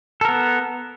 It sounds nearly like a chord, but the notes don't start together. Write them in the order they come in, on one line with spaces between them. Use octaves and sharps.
A4 A#4 B3